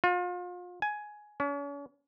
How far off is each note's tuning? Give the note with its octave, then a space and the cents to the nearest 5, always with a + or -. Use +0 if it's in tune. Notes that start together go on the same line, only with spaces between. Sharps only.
F4 +35
G#5 +10
C#4 +40